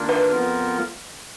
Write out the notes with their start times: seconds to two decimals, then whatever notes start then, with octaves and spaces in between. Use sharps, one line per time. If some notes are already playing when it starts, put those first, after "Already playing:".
Already playing: D#3 A#3 D4 F4 A#4
0.09 B4
0.31 F2 F3 B3 F4 A#4